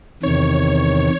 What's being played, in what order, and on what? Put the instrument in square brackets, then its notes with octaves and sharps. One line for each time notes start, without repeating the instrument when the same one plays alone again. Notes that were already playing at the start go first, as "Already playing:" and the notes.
[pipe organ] E2 C3 D#3 [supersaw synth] C#5